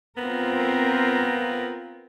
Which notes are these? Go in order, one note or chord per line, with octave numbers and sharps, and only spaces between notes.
B3 C4 F4 A#4